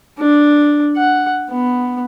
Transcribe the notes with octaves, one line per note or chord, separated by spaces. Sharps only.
D4
F#5
B3